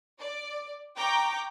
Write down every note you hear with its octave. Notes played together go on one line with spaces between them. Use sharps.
D5
G5 A#5 C#6 D6 G6